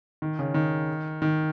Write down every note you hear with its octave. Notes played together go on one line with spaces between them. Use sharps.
D#3
C#3
D#3
D#3